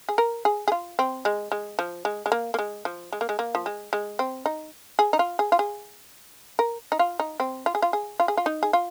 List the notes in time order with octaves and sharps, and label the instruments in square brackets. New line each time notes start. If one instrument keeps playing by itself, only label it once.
[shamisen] G#4
A#4
G#4
G#4
F4
C4
G#3
G#3
F3
G#3
G#3
A#3
A#3
G#3
F3
G#3
A#3
G#3
A#3
F3
G#3
G#3
C4
D#4
G#4
D#4
F4
G#4
F4
G#4
A#4
D#4
F4
D#4
C4
F4
G#4
F4
G#4
F4
G#4
F4
D#4
G#4
F4